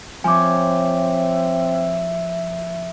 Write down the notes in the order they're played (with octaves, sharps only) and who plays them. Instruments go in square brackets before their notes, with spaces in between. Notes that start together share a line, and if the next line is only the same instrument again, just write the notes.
[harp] F3 C#5 [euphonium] C4 [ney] E5 [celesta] G#5 D6